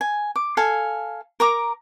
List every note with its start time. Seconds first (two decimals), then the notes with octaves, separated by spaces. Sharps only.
0.01 G#5
0.36 D6
0.57 A4 F5 G#5
1.40 A#4 A#5 D6